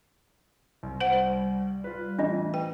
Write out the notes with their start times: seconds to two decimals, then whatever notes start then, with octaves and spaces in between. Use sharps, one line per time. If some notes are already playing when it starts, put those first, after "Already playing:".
0.83 C2
1.01 C5 F#5
1.14 G3
1.84 F4 B4
2.18 A2 E3 D4 F4 D#5
2.54 B4 G5